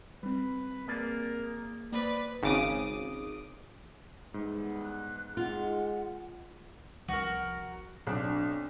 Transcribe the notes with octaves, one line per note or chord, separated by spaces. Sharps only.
G3 C4 B4
A#3 G#4 A#4 D5
A#3 B4 C5 D5 D#6
G#1 C#3 D6 D#6
G#2 E3 G3 B3
F#6
G#3 F4 F#5
C2 F3 F#4 A#4
B1 C4 D4